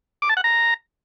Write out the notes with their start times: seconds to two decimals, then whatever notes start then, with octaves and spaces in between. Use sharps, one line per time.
0.22 D6
0.29 A5
0.37 F#5
0.44 A#5